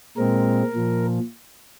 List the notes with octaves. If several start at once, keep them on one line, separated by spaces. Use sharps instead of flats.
A#2 G#3 C4 A#4
A#2 F3